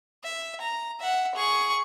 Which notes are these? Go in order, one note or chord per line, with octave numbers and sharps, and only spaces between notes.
E5
A#5
E5 F#5
G#4 C#6